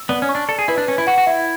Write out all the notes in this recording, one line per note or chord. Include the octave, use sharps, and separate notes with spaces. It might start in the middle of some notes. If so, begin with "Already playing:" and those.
Already playing: E6
B3 D5
C#4
C#6
D4
A4 D5
G#4
E4 B4
D4
C#4 B4
E4
F#4 F#5
F#4
E4 E5